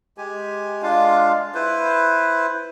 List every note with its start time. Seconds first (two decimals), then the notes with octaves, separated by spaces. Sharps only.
0.18 G#3 G4 G#5
0.83 G#3 D4 F4 F5
1.54 E4 B4 C5